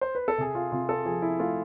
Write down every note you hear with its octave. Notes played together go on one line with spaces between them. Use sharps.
C5
B4
A4
C3 G#4
F4
C3 F4
A4
F3 G#4
E4
A3 F4